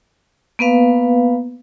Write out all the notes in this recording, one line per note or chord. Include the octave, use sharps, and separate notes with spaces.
A#3 B3 B4 F5